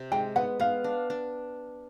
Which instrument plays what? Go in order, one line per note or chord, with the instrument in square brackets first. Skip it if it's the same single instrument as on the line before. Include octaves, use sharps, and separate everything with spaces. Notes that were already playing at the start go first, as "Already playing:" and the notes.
Already playing: [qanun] C3
[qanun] G#3 [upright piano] G5
[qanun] B3 [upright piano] F#5
[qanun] B3 [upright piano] F5
[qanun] D4
D4